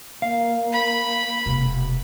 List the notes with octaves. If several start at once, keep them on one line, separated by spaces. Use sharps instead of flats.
A#3 F5
B5
E1 C3